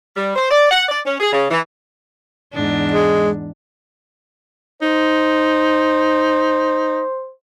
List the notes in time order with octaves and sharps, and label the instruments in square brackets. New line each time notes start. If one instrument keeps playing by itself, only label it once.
[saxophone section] G3
C5
D5
F#5
D5
C#4
G#4
C#3
E3
[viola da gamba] E2 G#2 D4
[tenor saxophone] G#3
[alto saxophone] D#4 [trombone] C5